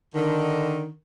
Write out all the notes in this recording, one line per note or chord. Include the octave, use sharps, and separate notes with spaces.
D3 D#3